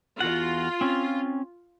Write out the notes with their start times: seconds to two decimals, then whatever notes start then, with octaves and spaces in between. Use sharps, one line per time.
0.20 E2 F4 F#4 F#5
0.81 C4 C#4